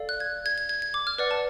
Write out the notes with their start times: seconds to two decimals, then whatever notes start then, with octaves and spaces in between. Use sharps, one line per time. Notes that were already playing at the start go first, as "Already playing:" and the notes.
Already playing: A4 D5 F5
0.09 F#6
0.20 G#6
0.46 G#6
0.58 G#6
0.69 G#6
0.82 G#6
0.94 D6
1.07 F6
1.18 B4 D5 F#5
1.31 A5